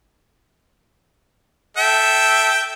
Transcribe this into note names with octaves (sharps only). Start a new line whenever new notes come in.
A4 E5 G5